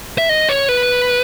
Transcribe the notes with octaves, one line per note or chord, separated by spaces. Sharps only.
E5
D#5
C#5
B4